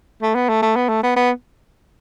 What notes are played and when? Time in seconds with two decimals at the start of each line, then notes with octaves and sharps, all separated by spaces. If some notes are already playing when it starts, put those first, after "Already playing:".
0.23 A3
0.35 B3
0.49 A3
0.62 A3
0.76 B3
0.89 A3
1.03 B3
1.16 B3